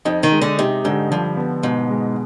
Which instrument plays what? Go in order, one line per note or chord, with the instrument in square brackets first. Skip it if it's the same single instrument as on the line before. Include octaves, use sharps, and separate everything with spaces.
[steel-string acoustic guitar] F2 [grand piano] D#4
[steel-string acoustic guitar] D#3
[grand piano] G#3
[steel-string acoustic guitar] D3
[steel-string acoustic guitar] C3 [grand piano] D#4
[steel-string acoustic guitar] G#2 [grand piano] D3
[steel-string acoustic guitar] G2 [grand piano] F3
[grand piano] B3
[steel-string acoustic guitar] G#2 [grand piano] B2
[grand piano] G#3